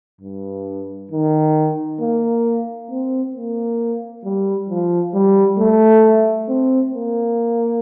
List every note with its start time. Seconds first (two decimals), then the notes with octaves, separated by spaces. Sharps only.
0.21 G2
1.11 D#3
2.00 A#3
2.91 C4
3.36 A#3
4.24 G3
4.69 F3
5.14 G3
5.59 A3
6.49 C4
6.94 A#3